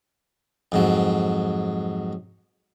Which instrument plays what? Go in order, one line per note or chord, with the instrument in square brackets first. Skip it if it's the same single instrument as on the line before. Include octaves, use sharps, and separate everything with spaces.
[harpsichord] F2 G#2 F#3